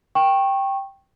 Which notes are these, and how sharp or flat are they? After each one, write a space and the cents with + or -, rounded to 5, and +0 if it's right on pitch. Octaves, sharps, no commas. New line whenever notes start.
G5 +0 C#6 -20